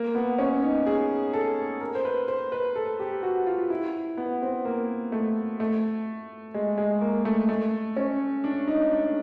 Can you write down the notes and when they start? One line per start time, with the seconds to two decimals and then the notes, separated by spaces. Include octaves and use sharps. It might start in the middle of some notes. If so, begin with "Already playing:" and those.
Already playing: A#3
0.15 B3
0.38 C#4
0.62 D#4
0.86 G#4
1.33 A4
1.81 A#4
1.95 C5
2.05 B4
2.28 C5
2.52 B4
2.75 A4
3.00 G4
3.23 F#4
3.47 F4
3.70 E4
4.17 B3
4.42 C4
4.65 A#3
5.12 A3
5.60 A3
6.54 G#3
6.78 G#3
7.01 A#3
7.25 A3
7.49 A3
7.96 C#4
8.44 D4
8.67 D#4
8.91 D4